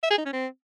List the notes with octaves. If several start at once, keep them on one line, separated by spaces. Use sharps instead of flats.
E5
G#4
D#4
C#4
C4